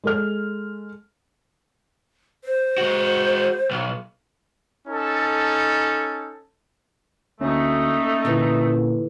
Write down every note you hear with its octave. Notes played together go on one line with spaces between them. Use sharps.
G#3 A4 F6
C5
G#3 F#4
B1
C#4 D#4 A4
D2 A3 A#3 C#4 D#4
A#2 D3 E3